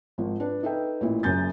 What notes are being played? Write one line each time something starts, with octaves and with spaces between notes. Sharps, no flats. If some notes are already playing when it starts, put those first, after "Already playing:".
G#1 F3
D4 B4
D#4 A4 B4 E5 G5
A1 A#2 E4
F#1 F#2 G6 A6